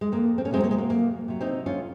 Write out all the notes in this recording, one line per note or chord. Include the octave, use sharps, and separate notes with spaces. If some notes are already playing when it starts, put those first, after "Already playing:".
G#3
F2 A#3
C4
C#4
C3 F#3 G#3 C4
A#3
G#3
A#3
F2 A#3
C3 F#3
C4 D#4
F2 C#4 F4